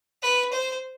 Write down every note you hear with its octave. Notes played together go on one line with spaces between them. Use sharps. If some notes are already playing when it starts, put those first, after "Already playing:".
B4
C5